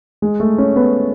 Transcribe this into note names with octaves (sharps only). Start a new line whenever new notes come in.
G#3
A3
C#4
B3